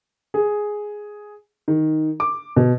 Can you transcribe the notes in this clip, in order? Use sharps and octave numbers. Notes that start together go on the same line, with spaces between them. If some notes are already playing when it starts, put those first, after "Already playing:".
G#4
D#3
D6
B2